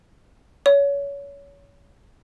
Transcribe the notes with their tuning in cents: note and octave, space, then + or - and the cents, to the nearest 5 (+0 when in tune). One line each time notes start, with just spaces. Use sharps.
C#5 +25